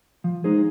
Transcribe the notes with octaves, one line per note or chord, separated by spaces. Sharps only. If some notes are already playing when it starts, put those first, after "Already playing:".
F3
G#3 D#4 G#4 C5